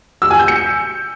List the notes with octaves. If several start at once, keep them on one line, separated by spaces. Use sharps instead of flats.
E6
G#5
G6
C#7